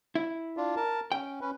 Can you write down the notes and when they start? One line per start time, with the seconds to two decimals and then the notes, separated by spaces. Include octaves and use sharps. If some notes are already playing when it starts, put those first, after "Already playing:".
0.15 E4
0.57 D4 F4
0.77 A#4 A5
1.12 C#4 G5
1.41 C#4 B4